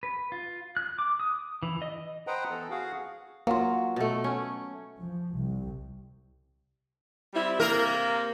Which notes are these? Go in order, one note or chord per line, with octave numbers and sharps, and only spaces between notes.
B4
F4
F#6
D6
D#6
E3
D#5
B4 C5 D#5 F#5 G5 A#5
E3 B3 A4
F#4 G#4 F5 F#5
F#3 A#3 F4
B2 A3
C#4
F3
C2
G3 C4 E4
C3 A#3 A#4